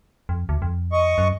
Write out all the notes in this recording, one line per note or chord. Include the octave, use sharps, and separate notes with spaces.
F2
D2
F2
D#5 C#6
F#2